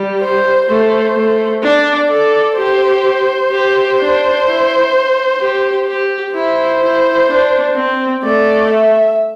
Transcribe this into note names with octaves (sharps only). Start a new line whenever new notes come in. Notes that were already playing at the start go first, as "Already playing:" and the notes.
Already playing: G3
C5
A3 C5
A3
D4 D5
A4 D5
G4 C5
G4
D4
E4
G4
G4
E4 C5
E4
D4
C4
A3 D5
E5